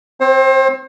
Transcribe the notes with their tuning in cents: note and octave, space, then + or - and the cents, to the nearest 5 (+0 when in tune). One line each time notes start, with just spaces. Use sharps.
C4 +0 C5 +35